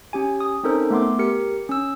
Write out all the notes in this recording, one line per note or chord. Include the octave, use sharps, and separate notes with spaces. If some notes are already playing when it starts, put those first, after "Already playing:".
C#4 G4 G#5
D#6
C4 C#4 D#4 A4 A#4 C5
A3 B3 C6 D6
G4 A#4 C#7
C#4 E6